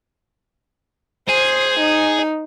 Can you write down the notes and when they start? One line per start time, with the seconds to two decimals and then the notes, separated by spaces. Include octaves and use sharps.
1.29 G#4 C5
1.80 D#4